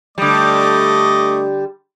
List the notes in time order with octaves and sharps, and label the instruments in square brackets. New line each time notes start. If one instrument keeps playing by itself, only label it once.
[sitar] D3 G3 [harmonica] A3 D#5 D6